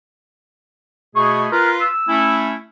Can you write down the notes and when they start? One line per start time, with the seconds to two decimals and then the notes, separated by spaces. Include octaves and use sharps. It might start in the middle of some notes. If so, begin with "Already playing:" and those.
1.16 B2 A3 G#4 C#6
1.52 F4 A#4 B4
1.81 E6
2.08 A3 C#4 E4